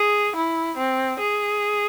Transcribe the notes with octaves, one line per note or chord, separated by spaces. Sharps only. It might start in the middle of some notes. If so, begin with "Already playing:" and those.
Already playing: G#4
E4
C4
G#4